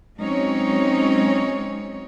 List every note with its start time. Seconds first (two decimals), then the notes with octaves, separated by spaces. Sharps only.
0.19 F#3 G#3 C4 C#4 D#4 C#5